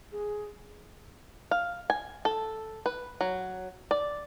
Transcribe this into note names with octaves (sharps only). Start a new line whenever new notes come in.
G#4
F5
G#5
A4
B4
F#3
D5